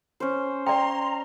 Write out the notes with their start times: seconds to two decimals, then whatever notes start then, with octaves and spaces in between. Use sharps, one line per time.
0.20 C#4 C5
0.67 D5 G5 A#5 C6